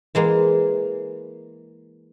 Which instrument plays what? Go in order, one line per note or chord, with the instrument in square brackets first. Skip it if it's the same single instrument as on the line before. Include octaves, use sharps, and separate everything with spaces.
[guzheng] E3 G#3 A#3